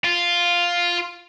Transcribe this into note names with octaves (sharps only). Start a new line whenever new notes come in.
F4